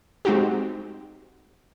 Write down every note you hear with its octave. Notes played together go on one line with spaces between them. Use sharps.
G#3 C4 D#4 F#4 G4